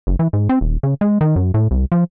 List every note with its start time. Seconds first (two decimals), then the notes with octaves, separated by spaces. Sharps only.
0.07 F#1
0.19 E3
0.33 G#2
0.49 C4
0.61 D#1
0.83 C#3
1.01 G#3
1.21 D#3
1.36 F#2
1.54 A2
1.71 C2
1.92 F3